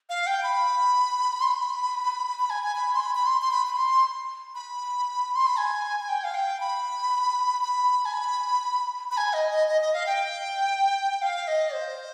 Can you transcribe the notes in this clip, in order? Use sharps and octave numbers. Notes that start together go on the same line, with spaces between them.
F5
G5
B5
C6
B5
B5
G#5
G#5
B5
C6
B5
B5
C6
C6
B5
B5
C6
B5
C6
B5
G#5
G#5
G5
F5
G5
B5
B5
G#5
B5
B5
G#5
D#5
D#5
D#5
D#5
F5
G5
F5
D#5
C5